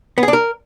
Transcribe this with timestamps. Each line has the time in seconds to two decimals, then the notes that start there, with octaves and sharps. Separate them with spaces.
0.18 B3
0.23 G#4
0.28 D4
0.33 A#4